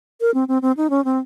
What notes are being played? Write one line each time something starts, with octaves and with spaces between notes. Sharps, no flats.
A#4
C4
C4
C4
D#4
C#4
C4